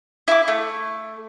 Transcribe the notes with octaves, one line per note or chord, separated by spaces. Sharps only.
E4 D6
A3